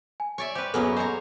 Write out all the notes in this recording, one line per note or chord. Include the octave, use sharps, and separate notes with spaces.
G#5
C#5 D5 E5
C4 G4 B4
F#2 F#3 A#3 B3 G#4 A4
G#3 C5 C#5 A#5